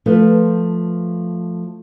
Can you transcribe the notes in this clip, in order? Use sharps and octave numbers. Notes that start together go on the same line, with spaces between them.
F3 A3 F4 B4